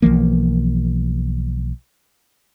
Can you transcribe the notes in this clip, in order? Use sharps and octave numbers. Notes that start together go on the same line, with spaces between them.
B1 E3 F3 A#3